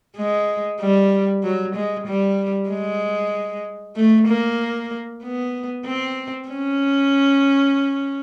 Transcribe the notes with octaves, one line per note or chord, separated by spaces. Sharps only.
G#3
G3
F#3
G#3
G3
G#3
A3
A#3
B3
C4
C#4